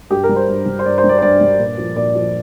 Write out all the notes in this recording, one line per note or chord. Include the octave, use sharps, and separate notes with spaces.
G2 G4
A#4
G3
C5
G2
G3
C5
G2 D5
C5
G3
D5
C5
G2 D5
G3
A#2
F3
A#2 D5
F3